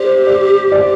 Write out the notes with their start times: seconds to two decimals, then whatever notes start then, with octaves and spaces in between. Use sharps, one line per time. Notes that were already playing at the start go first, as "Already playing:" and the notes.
Already playing: G4 C5 D5
0.26 D5
0.72 D5